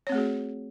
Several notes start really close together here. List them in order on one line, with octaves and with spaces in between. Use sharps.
C#5 C4 A3 G#4 F#4